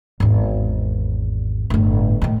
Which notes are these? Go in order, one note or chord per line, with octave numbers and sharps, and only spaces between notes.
G#1 E2
G1 A2
A2 D#3